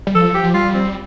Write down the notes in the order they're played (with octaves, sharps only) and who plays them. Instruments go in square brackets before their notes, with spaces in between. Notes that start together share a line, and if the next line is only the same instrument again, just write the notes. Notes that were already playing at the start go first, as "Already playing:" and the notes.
[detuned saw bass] G3
[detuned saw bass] F3 [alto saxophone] A4
[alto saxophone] G4
[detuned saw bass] F3
[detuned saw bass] G3 [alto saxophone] F4
[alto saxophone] C4